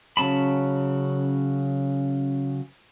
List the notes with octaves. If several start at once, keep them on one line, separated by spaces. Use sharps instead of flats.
C#3 F#3 C#4 A5 B5